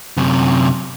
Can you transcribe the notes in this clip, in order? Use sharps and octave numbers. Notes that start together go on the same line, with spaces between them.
F#2 C3